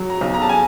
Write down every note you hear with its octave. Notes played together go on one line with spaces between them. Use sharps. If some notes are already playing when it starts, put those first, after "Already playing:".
Already playing: F#3
A#5
B1
A#5
A5
G#5